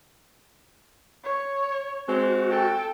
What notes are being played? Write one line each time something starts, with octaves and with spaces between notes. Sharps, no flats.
C#5
G#3 C4 F#4
A4 G5